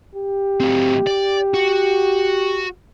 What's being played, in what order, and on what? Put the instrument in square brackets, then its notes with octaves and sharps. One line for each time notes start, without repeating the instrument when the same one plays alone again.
[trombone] G4
[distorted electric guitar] F#3 C4
D5
F#4